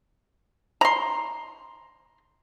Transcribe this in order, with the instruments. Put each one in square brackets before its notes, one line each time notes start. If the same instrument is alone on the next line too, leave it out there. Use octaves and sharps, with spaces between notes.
[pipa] A#5 C6